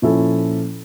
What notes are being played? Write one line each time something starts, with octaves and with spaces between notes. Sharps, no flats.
A#2 F3 C#4 E4 A4